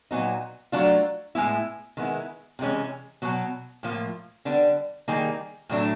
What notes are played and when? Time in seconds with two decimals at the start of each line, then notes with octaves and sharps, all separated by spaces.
0.11 A#2 F#3 B3 D#4
0.72 F#3 A3 D4 F4
1.35 A2 F3 G#3 B3 E4
1.97 D#3 G#3 B3 E4
2.59 C3 E3 G#3 C#4
3.22 B2 F#3 B3
3.83 A2 F3 A#3
4.45 D3 G3 B3 D4
5.08 D#3 G3 A#3 D#4 G#4
5.69 A2 F#3 A3 D4